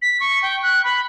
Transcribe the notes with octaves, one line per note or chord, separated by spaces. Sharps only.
B6
C#6
G5
F#6
B5